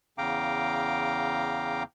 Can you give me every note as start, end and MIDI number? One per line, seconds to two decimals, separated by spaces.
0.18 1.83 40
0.18 1.83 49
0.18 1.83 77
0.18 1.83 79
0.18 1.83 82
0.18 1.83 86